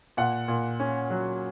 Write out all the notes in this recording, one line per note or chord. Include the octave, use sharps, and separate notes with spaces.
A#2 F#5
A#2
C#4
F#3